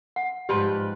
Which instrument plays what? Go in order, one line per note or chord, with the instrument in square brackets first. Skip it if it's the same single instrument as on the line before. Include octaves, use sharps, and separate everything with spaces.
[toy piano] F#5
[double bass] G#2 [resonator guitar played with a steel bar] F3 G3 B4 [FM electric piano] G4